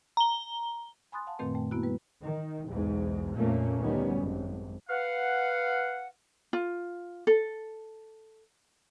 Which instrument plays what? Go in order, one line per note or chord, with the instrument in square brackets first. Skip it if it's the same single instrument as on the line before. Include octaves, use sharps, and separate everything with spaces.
[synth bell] A#5 G7
[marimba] G#5 B5 C6 D#6 F#6 A6
F5 F#5 A5
F#2 A#2 D#3 A3 C4 B4
A3 G5
A#3 B3 E4 F#4
G3 B4
[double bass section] D#3
B1 E2 G#2
F2 A#2 A3 A#3 C#4
D2 D#3 G3 B3 C#4
G#1 F#2
[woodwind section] B4 F5 F#5
[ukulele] F4
A4